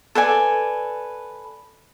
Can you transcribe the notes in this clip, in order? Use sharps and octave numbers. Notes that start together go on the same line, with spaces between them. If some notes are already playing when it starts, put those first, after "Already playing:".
A4 B4 D5 G#5